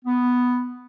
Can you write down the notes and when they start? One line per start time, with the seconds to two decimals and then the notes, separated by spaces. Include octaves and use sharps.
0.05 B3